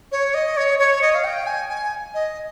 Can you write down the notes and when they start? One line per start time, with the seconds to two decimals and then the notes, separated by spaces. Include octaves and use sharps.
0.12 C#5
0.34 D#5
0.57 C#5
0.79 C#5
1.02 D#5
1.15 F5
1.24 G5
1.46 G#5
1.69 G#5
2.14 D#5